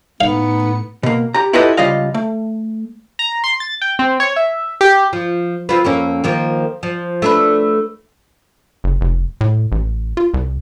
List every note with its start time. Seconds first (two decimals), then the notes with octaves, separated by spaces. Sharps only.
0.21 A2 B3 D#4 F5 C#7
1.03 B2 A#3
1.34 G4 A#5
1.53 E4 F4 G4 A4 B4 D#5
1.77 C#2 C#3 G3 F4 D#5 F5
2.14 A3
3.19 A#5
3.44 C6
3.60 A6
3.82 G5
3.99 C4
4.20 C#5
4.36 E5
4.81 G4
5.13 F3
5.69 C4 F4 B4
5.85 F2 A#3 C#4
6.24 D#3 F3 A#3
6.83 F3
7.22 A3 D4 B4
8.84 F#1
9.01 F1
9.41 A2
9.72 A1
10.17 F4
10.34 C2